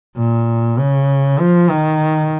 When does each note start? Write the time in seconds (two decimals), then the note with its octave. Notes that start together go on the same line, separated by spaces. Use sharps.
0.17 A#2
0.79 C#3
1.40 F3
1.70 D#3